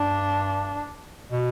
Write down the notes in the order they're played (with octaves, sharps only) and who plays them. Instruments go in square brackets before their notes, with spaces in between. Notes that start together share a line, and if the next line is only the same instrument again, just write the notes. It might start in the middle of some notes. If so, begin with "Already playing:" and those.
Already playing: [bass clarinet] G2 [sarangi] D4
[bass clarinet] B2